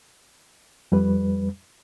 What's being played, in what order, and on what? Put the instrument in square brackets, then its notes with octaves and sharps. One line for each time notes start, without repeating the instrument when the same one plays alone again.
[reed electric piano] F2 G3 B4